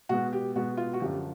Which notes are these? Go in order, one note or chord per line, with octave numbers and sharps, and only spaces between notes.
B2 G#3 B3 F#4
G4
B2 G#3 B3 F#4
F4
F#4
F#2 D3 F3 G4